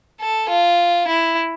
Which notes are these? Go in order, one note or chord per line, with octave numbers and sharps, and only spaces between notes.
A4
F4
E4